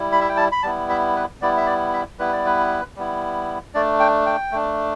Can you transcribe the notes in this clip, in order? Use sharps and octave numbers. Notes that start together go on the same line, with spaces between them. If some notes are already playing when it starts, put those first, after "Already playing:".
Already playing: G3 E4
B5
E5
G5
A5
B5
G3 B3 E4 A5
E5
B4
G3 B3 E4 D5
E5
D5
E5
G3 B3 E4 B4
D5
B4
G3 B3 E4
A3 D4 D5
G5
G5
A3 D4